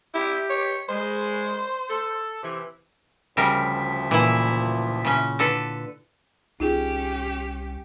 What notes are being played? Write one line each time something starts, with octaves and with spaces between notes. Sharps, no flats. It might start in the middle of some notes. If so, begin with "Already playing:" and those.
E4 G4
C#5
G#3 C5
A4
C3 E3
D2 C#3 F3 G3 A#4 E5
A#2 E3 E4
C#3 C#4
D3 A4 B4
C2 C#4 D#4 F4 G4 G#4